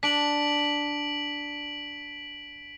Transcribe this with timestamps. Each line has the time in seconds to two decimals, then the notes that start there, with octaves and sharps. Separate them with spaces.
0.03 D4 B6 D7 F#7